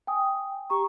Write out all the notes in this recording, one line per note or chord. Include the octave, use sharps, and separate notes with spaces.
G5 G#5 D#6
G4 A#5 C#6